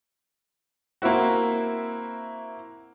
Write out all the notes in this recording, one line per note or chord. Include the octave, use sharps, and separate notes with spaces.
A#3 C4 E4 F#4